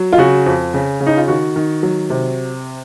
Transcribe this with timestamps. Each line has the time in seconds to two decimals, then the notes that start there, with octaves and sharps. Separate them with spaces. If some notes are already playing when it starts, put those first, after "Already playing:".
Already playing: F#3
0.13 F4
0.18 C#3 F#4
0.46 F2
0.74 C#3
1.00 C#3
1.06 D#4
1.17 F4
1.28 D#3 F#4
1.56 D#3
1.83 F#3
2.10 C3